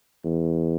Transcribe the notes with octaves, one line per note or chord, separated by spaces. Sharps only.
E2